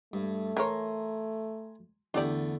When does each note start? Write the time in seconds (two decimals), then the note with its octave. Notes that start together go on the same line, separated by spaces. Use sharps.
0.13 G2 A3
0.57 E3 A#4 C#5 G#5 A#5 C6
2.14 E2 D3 A3 D4 G4 D5